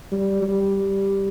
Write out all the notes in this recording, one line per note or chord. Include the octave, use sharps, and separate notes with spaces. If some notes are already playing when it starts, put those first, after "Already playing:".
G3
G3